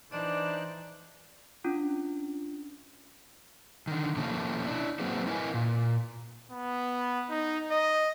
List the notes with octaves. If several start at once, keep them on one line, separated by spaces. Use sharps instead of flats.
E3 D4 D#4 C5 D5 F#6
C#4 D4 F4
D3 D#3
B2 F3 A#3 C#4 E4 A4
D4 E4
F#3 A#3 C4 F#4 G#4 B4
E4 A#4 B4 D5 D#5 G#5
A#2
B3
D#4
D#5